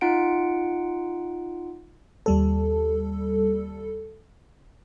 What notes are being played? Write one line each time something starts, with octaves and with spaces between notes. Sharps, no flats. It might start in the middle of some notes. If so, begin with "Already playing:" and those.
D#4 F4 F#5 D7
D#2 G3 A4